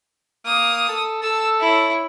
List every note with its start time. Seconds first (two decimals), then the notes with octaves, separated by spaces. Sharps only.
0.46 A#3 D#6
0.89 A4
1.23 A4 E6
1.61 E4 C#5